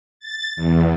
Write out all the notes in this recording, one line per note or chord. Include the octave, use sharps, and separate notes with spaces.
A6
E2